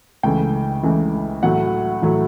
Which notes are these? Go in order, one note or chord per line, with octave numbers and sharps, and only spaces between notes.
C#2 C#3 E3 A3 G5
C#2 C#3 E3 A3
A2 F#3 A3 F#5
A2 F#3 A3